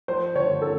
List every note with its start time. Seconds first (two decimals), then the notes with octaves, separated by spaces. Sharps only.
0.08 F3 C5
0.35 D3 C#5
0.62 C#4 A4